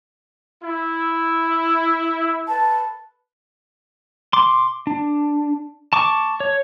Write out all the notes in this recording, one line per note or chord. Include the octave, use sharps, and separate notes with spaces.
E4
B4 A5
C6 D6
D4
A5 C#6 D6
C#5